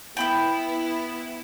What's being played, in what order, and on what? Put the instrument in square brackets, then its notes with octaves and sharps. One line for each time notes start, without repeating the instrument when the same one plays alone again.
[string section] B3 E4 [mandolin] G5 B5 G6